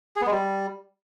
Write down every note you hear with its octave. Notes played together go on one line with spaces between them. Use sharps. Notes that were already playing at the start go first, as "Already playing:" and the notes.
G#4
B3
G#3
G3